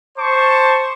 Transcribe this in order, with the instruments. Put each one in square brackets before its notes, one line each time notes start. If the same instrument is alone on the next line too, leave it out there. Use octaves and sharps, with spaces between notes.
[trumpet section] C5 A5 C#6 D6